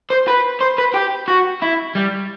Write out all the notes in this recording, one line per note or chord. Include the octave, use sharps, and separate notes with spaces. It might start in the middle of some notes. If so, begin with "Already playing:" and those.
C5
B4
C5
B4
G4
F#4
E4
G3